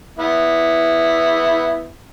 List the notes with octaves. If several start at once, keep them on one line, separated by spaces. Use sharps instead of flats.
B3 E4